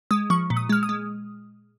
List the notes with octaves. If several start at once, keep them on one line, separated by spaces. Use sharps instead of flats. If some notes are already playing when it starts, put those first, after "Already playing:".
G#3 D#6
F3 C#6
A#2
D#6
G#3 F6
D#6
G#3